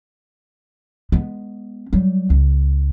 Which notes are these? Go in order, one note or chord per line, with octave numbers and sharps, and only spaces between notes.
G#3 B3
F#3 G3
C#2